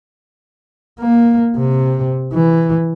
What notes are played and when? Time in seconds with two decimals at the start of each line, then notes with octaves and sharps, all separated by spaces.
1.00 A#3
1.58 C3
2.33 E3